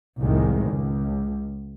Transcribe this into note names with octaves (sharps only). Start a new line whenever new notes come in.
C2 F2 A2 D#3 G#3
C#2